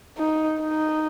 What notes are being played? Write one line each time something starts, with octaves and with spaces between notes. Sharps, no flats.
D#4
D#4